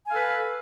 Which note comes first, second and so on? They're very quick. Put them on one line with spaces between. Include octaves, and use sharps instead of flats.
G#5 F5 A4 B4